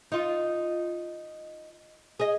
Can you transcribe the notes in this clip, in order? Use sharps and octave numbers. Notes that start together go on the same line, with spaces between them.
D#4 F4
G#4 D#5